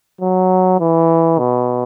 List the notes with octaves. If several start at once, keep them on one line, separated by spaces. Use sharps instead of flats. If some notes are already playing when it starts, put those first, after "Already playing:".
F#3
E3
B2